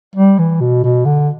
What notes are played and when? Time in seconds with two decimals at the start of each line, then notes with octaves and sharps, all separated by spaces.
0.16 G3
0.39 E3
0.61 B2
0.84 B2
1.05 D3